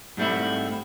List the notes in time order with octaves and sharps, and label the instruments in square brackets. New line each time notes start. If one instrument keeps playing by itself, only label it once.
[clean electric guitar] G#2 G3 A3 C4 E4